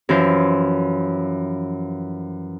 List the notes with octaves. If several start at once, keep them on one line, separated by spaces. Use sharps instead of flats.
F#2 E3 F3 C5